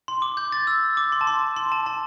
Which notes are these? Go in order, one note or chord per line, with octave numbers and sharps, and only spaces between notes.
C6
D6
G6
A6
E6
D6
C6
A5
C6
C6
A5
A5